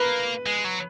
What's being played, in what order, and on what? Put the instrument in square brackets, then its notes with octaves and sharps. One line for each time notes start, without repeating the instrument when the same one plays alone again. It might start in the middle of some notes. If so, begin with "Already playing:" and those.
Already playing: [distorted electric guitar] A#3 [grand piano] B4
[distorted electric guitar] G#3
F#3